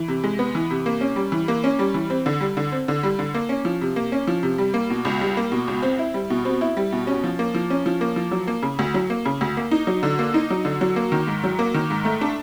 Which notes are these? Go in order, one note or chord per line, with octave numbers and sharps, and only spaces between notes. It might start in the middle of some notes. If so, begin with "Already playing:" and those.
Already playing: E3
C3
G#3
B3
E3
C3
A#3
C#4
G3
E3
A#3
C#4
G3
E3
C4
D3
G3
D3
C4
D3
G3
D3
A#3
C#4
F3
C3
A#3
C#4
F3
C3
G3
A#3
B2
C#2
G3
A#3
B2
C#2
C4
E4
G3
B2
C4
E4
G3
B2
C#4
F3
A#3
F3
C#4
F3
A#3
F3
F#3
A#3
C#3
D2
F#3
A#3
C#3
D2
A#3
D#4
F#3
D3
A#3
D#4
F#3
D3
F#3
A#3
D#3
G#2
F#3
A#3
D#3
G#2
A3
D4